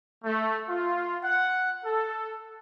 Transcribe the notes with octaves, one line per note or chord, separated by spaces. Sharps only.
A3
F4
F#5
A4